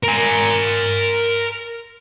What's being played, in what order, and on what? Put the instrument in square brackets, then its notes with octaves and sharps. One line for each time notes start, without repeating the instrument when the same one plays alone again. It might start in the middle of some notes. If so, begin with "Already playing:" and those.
[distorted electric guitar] A#4 G#5